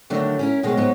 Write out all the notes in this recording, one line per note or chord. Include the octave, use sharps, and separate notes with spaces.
D3 D#3 F#3 A3 D4
C#4 E4 A#4
B2 D#3 F#3 G#3 C4
G#2 F#3 B3 D#4